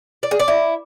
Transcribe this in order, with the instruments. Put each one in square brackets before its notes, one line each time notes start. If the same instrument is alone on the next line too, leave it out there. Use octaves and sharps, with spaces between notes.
[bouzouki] D5
G#4
D5
E4